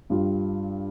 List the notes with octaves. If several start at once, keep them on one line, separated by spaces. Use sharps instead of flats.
G2 G3 F4